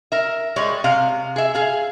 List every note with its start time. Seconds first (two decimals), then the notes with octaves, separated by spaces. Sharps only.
0.12 A#4 E5
0.56 G3 G#3 C#5
0.84 C3 F5
1.36 G#4 E5
1.55 G#4 F5